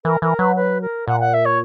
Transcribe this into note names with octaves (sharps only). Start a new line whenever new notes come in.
E3 A#4
E3 A#4
F#3 B4
B4
A#4
A#2 F#5
F#5
E5
C#5